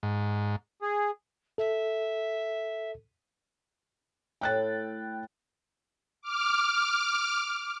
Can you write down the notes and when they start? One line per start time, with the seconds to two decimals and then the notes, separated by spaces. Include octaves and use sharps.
0.03 G#2
0.82 G#4
1.58 A4 E5
4.41 A2 G5 F#6 A6
6.22 D6 F6